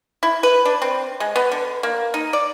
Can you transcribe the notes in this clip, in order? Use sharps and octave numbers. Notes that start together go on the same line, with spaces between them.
E4
B4
D4
C4
G#3
B3
D3
A#3
D#4
D5